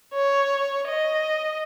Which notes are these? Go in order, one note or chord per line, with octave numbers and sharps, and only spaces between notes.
C#5
D#5